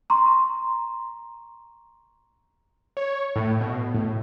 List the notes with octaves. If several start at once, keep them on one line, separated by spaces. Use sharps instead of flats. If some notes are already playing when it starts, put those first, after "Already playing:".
A#5 C6 C#6
C#5
A2
B2
A2